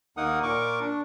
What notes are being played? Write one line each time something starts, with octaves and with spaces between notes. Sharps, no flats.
D#2 A#3 D#4 A#4 F#5 D#6
A#2 A#4 C#6 D6
D4